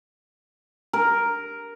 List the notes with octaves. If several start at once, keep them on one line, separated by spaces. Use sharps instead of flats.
A#4